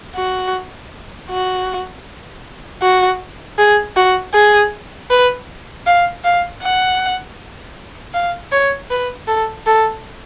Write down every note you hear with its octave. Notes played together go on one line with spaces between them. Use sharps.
F#4
F#4
F#4
G#4
F#4
G#4
B4
F5
F5
F#5
F5
C#5
B4
A4
A4